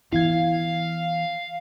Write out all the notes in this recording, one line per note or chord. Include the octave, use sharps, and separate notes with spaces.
E3 B3 E4 F5 G#6